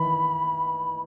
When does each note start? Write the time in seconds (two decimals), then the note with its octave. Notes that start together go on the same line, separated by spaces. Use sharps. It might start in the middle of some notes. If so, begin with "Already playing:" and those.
Already playing: D#3 E3 B5